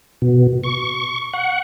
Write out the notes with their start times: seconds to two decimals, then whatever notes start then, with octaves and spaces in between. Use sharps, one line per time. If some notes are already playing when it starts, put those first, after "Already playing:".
0.22 B2
0.63 C#6
1.33 F#5